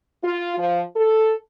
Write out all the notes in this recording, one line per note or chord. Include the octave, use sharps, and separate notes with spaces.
F4
F3
A4